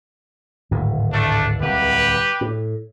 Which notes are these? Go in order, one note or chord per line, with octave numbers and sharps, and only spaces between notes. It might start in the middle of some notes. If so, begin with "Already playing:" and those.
D1 G#1 A2
A3 D4
D1 C2 G4 B4
A2